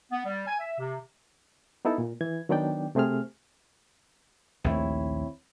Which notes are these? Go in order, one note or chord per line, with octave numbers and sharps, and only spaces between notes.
B3
G3
G#5
E5
C3
B3 D#4 E4 A4
A#2
E3 G#6
D#3 F#3 B3 D4 D5 G5
C3 A3 C4 G#4 F6
A#1 D#2 A3 C4 E4 C#5